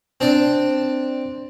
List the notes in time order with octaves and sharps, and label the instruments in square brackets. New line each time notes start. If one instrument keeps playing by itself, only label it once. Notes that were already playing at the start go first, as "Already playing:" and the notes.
[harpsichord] C4 D4 D5